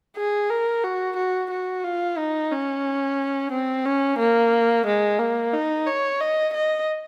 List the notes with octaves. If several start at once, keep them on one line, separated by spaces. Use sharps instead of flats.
G#4
A#4
F#4
F#4
F#4
F4
D#4
C#4
C4
C#4
A#3
G#3
A#3
D#4
C#5
D#5
D#5